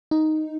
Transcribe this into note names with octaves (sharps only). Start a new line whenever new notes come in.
D#4